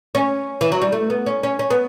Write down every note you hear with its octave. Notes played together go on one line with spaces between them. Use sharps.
C#4
E3
F#3
G3
A3
B3
C#4
C#4
C#4
B3